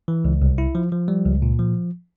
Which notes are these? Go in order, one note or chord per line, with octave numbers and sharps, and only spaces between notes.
E3
C#2
C2
E4
F3
F3
G3
C#2
A#2
F3